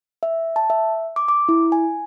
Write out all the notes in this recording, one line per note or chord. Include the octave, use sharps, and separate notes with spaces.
E5
A5
E5
D6
D6
E4
G#5